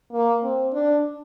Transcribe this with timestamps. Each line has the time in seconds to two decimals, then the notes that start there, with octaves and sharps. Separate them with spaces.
0.13 A#3
0.43 C4
0.73 D4